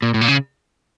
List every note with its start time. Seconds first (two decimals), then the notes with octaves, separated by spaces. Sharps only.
0.02 A#2
0.14 A2
0.21 A#2
0.28 C#3